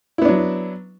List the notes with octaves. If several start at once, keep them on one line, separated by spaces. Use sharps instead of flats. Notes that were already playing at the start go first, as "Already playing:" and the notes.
F#3 B3 D4 E4